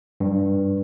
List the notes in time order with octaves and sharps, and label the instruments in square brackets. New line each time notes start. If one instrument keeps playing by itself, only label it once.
[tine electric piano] G2